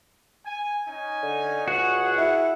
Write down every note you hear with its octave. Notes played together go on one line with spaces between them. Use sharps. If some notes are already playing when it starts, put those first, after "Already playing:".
G#5
C#4 D#4 G#5
D3
C#2 F#4 G#4 F#5
E4